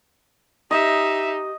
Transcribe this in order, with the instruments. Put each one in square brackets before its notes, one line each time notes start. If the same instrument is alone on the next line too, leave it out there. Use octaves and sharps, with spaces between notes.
[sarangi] D#4 [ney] G4 [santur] D#5 [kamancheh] E5